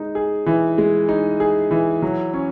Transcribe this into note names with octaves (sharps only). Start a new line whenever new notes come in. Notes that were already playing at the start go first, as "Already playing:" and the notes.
Already playing: G#3 D#4
G#4
E3
G#3
D#4
G#4
E3
F#3
C#4